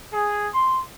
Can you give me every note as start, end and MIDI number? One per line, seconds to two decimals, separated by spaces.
0.12 0.46 68
0.53 0.79 84